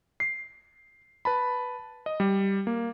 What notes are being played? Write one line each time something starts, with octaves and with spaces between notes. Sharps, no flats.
C7
B4 A5 B5
D#5
G3
A#3